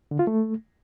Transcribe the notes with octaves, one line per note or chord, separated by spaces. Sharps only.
D3
F4
A3